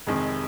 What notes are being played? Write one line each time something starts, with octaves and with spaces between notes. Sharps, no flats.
F1 F2 C3 D#3 G#3